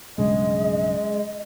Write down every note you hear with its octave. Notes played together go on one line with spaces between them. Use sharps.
B1 G2 C#3 G#3 D#5